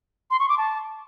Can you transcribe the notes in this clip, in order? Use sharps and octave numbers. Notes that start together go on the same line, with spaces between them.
C6
C#6
D6
A5